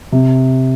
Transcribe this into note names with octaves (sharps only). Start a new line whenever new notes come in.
C3